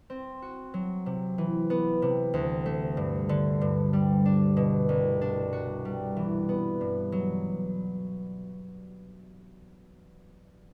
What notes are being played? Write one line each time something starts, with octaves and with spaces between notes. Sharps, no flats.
C4
F#4
F#3
C3
E3
B3
C3
D2
A3
G2
D3
G2
G3
D4
B2
C2
D4
F#4
G3
E3
B3
G2
F#3